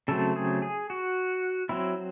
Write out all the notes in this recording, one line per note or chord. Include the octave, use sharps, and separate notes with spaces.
C#3 F#3 A3 C4 A4
G#4
G#4
F#4
F#3 C4 E4